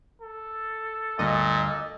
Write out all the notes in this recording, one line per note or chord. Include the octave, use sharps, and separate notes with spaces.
A4
G1 D2 G2 A#2 D#5